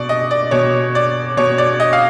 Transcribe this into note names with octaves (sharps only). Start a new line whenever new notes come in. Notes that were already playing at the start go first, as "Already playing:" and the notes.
Already playing: B2 D5
D#5
D5
B2 C#5
D5
B2 C#5
D5
D#5
F5